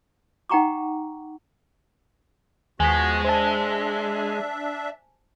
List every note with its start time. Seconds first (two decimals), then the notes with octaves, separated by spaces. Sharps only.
0.49 D#4 F#5 G5 A#5 C#6 D6
2.80 D#2 F3 G#3 B3 F#4 G#5 B6
3.25 D4 C5 E5 A5